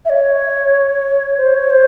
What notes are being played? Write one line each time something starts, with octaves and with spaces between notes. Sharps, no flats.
E5
C#5
C5
C#5
C5